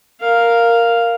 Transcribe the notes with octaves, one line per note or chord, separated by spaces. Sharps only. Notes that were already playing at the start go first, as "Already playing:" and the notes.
A#4 F5